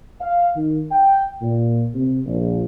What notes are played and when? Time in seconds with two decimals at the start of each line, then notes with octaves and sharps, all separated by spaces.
0.20 F5
0.56 D#3
0.91 G5
1.41 A#2
1.94 C3
2.25 A#1